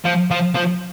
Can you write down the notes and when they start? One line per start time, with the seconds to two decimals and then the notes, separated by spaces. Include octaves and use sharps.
0.04 F3
0.31 F3
0.55 F3